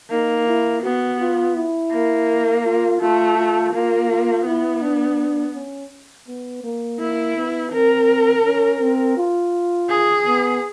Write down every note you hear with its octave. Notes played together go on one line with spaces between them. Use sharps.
A#3 D#4
E4
B3 F#4
F4
E4
A#3
F4
A3 F4
F4
A#3 F4
F4
B3 E4
D4
C#4
B3
A#3
A#3 E4
B3
C4 A#4
C#4
C4
F4
G#4
B3